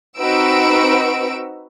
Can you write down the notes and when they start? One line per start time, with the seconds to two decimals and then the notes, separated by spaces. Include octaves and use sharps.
0.19 C4 D#4 F#4 B4 E6 D7